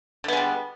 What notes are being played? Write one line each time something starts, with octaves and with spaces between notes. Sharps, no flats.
D3 G3 G#3 B3